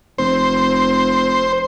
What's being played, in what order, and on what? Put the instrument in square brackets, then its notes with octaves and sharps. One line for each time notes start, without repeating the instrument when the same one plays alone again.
[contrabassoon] F1 [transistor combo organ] C5